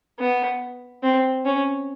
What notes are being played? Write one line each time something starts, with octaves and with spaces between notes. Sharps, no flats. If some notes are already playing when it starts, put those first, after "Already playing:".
B3
C4
C#4